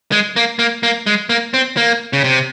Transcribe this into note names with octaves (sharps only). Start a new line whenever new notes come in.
G#3
A#3
A#3
A#3
G#3
A#3
C4
A#3
C#3
C3